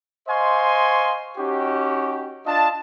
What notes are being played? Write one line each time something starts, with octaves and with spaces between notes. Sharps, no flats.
C5 D#5 F5 G#5 C6 C#6
C#4 D#4 F#4 G4
D4 F4 D#5 A5